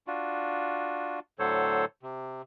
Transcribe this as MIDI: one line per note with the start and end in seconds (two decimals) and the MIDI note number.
0.07 1.19 62
0.07 1.19 65
0.07 1.19 66
1.39 1.85 45
1.39 1.85 50
1.39 1.85 54
1.39 1.85 69
1.39 1.85 72
1.39 1.85 73
2.03 2.42 48